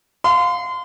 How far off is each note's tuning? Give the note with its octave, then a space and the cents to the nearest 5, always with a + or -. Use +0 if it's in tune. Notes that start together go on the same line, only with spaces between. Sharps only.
F5 +20 C6 -30